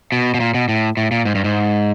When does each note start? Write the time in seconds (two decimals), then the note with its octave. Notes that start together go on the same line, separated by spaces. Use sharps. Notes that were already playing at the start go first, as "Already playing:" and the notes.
0.12 B2
0.34 B2
0.40 A#2
0.54 B2
0.69 A2
0.97 A2
1.11 A#2
1.25 G#2
1.35 G2
1.44 G#2